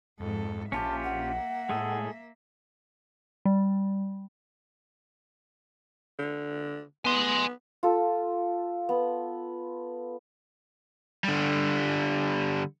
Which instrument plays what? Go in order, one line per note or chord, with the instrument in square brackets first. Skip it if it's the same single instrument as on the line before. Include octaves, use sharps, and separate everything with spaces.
[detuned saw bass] F2 [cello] G#2 A4
[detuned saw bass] A#1 [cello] A#3 E5 [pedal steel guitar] C#4 F4 G4 [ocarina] A5
[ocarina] F#5
[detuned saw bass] A2 [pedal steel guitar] G#3 G#4 A4
[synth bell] G3
[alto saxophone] D3
[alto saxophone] B3 [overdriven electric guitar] G#5 C6
[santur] F4 A4
B3
[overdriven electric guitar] D3 G3